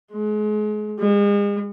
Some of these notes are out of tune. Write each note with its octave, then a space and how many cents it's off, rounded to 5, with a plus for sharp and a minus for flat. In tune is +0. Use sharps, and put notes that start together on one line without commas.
G#3 +35
G#3 -40